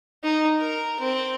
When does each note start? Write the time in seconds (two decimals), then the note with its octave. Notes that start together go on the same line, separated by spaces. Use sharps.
0.23 D#4
0.59 A#4
0.99 C4